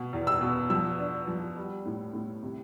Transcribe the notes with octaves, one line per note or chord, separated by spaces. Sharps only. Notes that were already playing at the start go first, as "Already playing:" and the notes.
Already playing: B2
E2
E6
B2
F3 E6
D4
F3
G3
A2
A2
C3